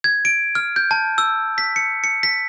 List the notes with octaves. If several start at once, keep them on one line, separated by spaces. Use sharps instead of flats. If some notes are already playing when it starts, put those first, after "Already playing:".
G#6
D7
F6
G6
A5
E6
B6
C#7
C#7
B6